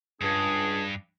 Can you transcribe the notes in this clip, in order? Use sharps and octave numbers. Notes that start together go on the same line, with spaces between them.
C#2 G2 D4 G#4